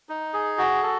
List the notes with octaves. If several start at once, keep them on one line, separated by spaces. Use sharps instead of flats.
D#4
G#4
F#4
A4